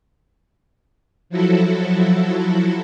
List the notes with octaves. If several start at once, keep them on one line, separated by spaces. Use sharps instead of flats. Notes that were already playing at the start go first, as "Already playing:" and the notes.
F3 F#3 E4 F#4 A4